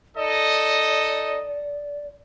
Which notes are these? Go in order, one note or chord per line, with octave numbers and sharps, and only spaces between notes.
D#4 A4 D5 D#5